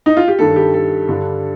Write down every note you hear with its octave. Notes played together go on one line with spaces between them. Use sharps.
D#4
F4
G4
G2 D#3 G3 A4
G4
A4
G2 D3 G3 D4